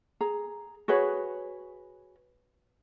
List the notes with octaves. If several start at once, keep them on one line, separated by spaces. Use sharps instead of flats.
G#4 A#5
F#4 G#4 B4 C#5